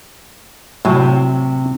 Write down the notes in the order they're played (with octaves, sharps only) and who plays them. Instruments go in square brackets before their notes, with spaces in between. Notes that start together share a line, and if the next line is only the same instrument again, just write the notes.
[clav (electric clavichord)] A2 F#3 G#5 [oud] C3